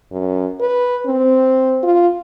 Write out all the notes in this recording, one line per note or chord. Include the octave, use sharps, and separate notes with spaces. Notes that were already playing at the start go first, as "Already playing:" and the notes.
F#2
B4
C4
F4